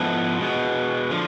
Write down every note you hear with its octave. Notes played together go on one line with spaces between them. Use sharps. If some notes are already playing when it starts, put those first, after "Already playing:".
Already playing: G#2 F3 B3 E4 A4
B2 G#3 B3
D3 F3